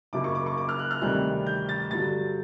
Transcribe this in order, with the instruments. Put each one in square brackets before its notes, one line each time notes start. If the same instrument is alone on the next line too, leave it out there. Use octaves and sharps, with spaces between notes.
[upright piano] F#1 F#2 C#3 D6
C#6
D6
C#6
D6
F6
F#6
F6
D2 C3 D#3 G3 C4 F#6
G6
A6
G2 D3 F#3 A6